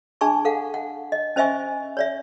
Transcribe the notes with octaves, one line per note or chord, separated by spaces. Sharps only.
D4 G#4 G#5 A5 C#6
A4 F5 F#5
F#5
D#5
C#4 C5 D#5 E5 G#5 C#6
C#5 D5 E5